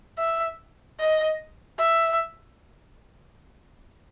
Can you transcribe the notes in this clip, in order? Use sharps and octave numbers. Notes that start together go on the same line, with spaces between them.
E5
D#5
E5